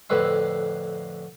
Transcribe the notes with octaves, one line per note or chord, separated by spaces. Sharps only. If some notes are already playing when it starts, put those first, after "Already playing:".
F2 A2 D3 B4 E5 C6